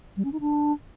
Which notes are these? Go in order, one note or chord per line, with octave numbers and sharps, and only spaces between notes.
G3
C#4
D#4
D4